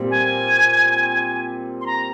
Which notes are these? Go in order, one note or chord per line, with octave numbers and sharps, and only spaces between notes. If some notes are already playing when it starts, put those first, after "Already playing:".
Already playing: A#2 G3 C4
G#5
C6
A#5